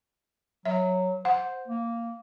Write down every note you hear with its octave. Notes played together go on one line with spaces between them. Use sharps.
F#3 E5
C5 F#5
A#3